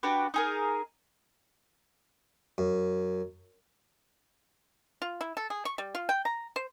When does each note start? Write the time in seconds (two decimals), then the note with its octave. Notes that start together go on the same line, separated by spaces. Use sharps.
0.03 D4 F#4 G4 B4
0.34 D#4 G#4 A#4
2.58 F#2
5.02 F4
5.21 E4
5.37 A4
5.50 G#4
5.65 C#6
5.78 G3
5.95 F4
6.09 G5
6.25 A#5
6.56 C5